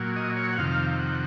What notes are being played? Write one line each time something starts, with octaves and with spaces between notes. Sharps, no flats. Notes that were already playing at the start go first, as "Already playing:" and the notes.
Already playing: A#2 F#3
D#5
C#5
F#5
F2 C3 D#3 F5
F#5